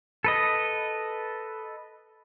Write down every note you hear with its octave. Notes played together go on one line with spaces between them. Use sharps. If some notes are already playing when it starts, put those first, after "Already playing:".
A4 B4 D#5